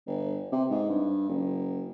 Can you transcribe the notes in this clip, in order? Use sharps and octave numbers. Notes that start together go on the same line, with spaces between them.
G1
C3
G#2
G2
F#1